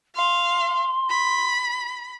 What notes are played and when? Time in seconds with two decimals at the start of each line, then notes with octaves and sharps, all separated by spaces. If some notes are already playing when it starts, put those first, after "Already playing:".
0.15 F5 C6
1.10 B5